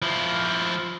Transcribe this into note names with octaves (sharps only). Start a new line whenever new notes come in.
F3 E4